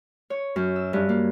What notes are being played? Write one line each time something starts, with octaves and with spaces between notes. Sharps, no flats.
C#5
F#2
E6
G2
A#3